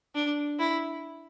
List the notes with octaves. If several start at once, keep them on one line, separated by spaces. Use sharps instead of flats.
D4
E4